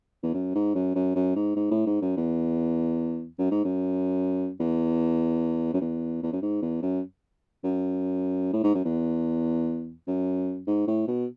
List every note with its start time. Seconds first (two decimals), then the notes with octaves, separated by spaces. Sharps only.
0.23 E2
0.34 F#2
0.55 G#2
0.75 F#2
0.95 F#2
1.15 F#2
1.36 G#2
1.56 G#2
1.71 A2
1.86 G#2
2.02 F#2
2.17 E2
3.39 F#2
3.51 G#2
3.64 F#2
4.60 E2
5.73 F#2
5.81 E2
6.23 E2
6.32 F#2
6.42 G#2
6.62 E2
6.82 F#2
7.64 F#2
8.53 A2
8.64 G#2
8.75 F#2
8.85 E2
10.07 F#2
10.67 G#2
10.87 A2
11.08 B2